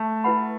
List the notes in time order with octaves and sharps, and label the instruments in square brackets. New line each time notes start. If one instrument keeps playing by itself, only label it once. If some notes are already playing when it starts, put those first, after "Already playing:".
Already playing: [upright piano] A3
[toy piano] E4 B4 F#5 B5